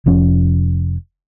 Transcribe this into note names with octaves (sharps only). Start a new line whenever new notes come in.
F1 F3 C#4